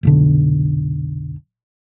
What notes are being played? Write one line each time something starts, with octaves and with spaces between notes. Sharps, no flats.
F1 B1 D3